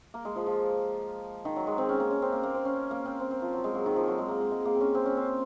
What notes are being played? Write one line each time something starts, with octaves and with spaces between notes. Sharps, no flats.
A#3
G#3
F3
F3
D#3
F#3
G#3
C4
C#4
A#3
C#4
C4
A#3
A#3
C4
C#4
A#3
C4
C4
C4
F3
F#3
G#3
F#3
D#3
F3
F#3
G#3
A#3
G#3
G#3
A#3
C4
C#4
C4
C#4
C4